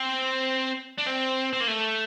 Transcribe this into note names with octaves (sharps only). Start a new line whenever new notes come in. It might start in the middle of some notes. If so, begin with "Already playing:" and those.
Already playing: C4
D4
C4
C4
A#3
A3